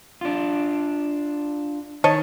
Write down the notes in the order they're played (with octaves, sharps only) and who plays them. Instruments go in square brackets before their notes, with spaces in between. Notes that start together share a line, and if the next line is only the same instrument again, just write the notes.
[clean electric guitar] D4 F4
[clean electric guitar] D#3 [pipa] C#5 D#5 A5